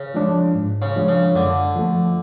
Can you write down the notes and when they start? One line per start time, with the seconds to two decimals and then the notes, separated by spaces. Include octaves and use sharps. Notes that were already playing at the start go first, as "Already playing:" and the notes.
Already playing: C#3
0.14 F3 G#3 D4
0.55 G#2
0.82 C#3
0.96 F3 G#3 D4
1.08 C#3
1.35 F#2 D3
1.76 F3 A3